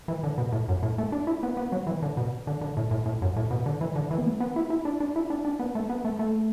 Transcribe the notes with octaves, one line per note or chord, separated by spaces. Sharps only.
E3
D3
B2
A2
F#2
A2
A3
D4
E4
B3
B3
F#3
E3
D3
B2
D3
D3
A2
A2
A2
F#2
A2
B2
D3
E3
D3
E3
B3
A3
B3
E4
E4
D4
D4
E4
D4
D4
B3
A3
B3
A3
A3